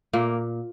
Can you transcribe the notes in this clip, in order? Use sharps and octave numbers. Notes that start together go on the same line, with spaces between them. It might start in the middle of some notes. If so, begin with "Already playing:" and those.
A#2 A#3